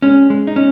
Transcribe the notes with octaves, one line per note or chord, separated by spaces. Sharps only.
G#3 C#4
G#3
D#4
C#4